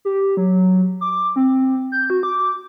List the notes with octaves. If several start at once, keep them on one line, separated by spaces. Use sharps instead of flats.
G4
F#3
D6
C4
G6
F#4
D6